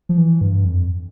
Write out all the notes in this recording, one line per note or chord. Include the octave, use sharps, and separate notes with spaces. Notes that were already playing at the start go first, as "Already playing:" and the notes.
F3
E3
G2
F2